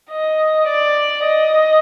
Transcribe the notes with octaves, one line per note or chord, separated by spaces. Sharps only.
D#5
D5
D#5